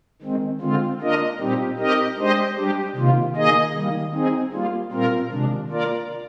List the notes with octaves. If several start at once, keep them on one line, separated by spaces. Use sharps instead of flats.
D#3 G#3 C4
D3 G#3 C4 F4
A#3 D4 F4 A#4 D#5
A#2 G3 C4 D#4 G4
C4 D#4 G4 A#4 D#5
G#3 D4 G4 C5 D#5
G3 D4 G4
C3 D#3 A#3 F4
D#3 A#3 D#4 G#4 D#5
D#3 G3 A#3
C4 D#4 G#4
G3 A#3 F4
A#2 G3 C4 F4 A#4
C3 D#3 G#3 D4
A#3 F4 A#4 D5